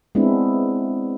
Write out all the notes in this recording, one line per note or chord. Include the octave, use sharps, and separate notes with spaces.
G#3 B3 C4 D4 E4